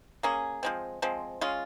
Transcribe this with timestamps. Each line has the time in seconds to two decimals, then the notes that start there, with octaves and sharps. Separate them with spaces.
0.23 A#3 C#4 G#4
0.63 F3 G#3 C4
1.02 F3 G#3 C4
1.41 G#3 C#4 F4